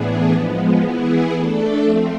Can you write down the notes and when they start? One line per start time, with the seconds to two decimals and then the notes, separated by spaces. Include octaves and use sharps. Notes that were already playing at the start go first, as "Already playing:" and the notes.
Already playing: A2 E3 B3 D4 G#4
0.31 F3 G#3 B3
0.81 E3 B3 E4 G#4
1.33 A3 D4 A4
1.83 F3 A3 C4